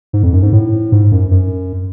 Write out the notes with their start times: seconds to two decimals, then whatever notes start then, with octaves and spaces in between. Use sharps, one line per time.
0.13 G#2
0.23 F2
0.33 F#2
0.43 G#2
0.53 A2
0.92 G#2
1.12 F#2
1.31 F#2